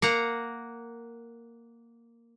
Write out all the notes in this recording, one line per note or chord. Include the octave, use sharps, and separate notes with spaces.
A#3 F#5 A#5